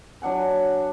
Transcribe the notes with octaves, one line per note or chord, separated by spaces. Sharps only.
F#3 D4 F#5 G#5